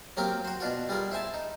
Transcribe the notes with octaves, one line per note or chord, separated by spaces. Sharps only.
F#3 A#3 C4 G4 A#4
F#4 C5
B2 D4 F4 F#4
G3 F4 G#4 A#4
E4 C5 G#5 A5
D#4